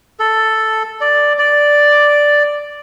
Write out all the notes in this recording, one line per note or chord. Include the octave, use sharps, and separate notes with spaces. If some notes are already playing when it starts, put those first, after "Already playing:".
A4
D5
D5